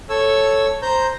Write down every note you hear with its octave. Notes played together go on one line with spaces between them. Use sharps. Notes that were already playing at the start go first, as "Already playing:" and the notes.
A4 C#5 E6
C5 A#5 G6